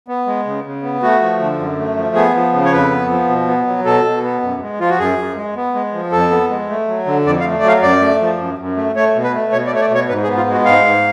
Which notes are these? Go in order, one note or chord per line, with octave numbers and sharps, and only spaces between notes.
B3
G#3
C#3
C#3
B3
A3 F#4
F3
D3
F#2
A3
F3
B3 G#4
F3
C#3
C#5
F2 B4
B3
F3
B2
B3
F#3
B2 A4
B2
B3
F#2
G#3
F3 F4
F#4
F#2 G#4
F#2
G#3
B3
G#3
F3
F2 A4
B3
G#3
A3
F#3
D3
F2 D5
F5
A3
D5
F#3 F5
F#2 D5
A3
F3
F#2
F#2
A3
A3 C#5
B2
B4
A3
B2 C#5
D5
A3 C#5
D5
B2 C#5
G#2 B4
G#4
B3
F4
G#3 F#4
G#2 F5
G#2